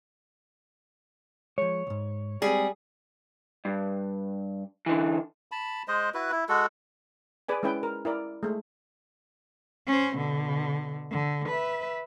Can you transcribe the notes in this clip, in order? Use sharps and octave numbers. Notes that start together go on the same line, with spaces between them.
F3 G#3 C#5
C#2 G#2
G3 G#3 C4 G#4
G2
D3 E3
A5 B5
G#3 C5 D#5
E4 F#4 B4
E4
G#3 F#4 A4
G#4 B4 D5 G#5
G#3 C#4 E4 B4 G5
A#4
E4 A#4 D5
G#3 A3
C#4 C5
B2 D3
D3
B4 E5